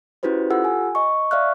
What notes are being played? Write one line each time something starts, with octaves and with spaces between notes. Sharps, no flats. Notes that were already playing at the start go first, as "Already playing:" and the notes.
C#4 E4 F#4 G4 B4 C5
F4 G4 A4 F#5 E6
G#5
D#5 C#6
D5 E5 F5 C#6 F6 F#6